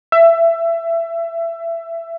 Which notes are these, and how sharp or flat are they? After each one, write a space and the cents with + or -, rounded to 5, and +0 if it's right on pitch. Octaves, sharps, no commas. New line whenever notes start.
E5 +20